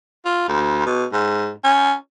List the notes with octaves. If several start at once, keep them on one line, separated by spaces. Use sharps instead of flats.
F4
D2
B2
G#2
C#4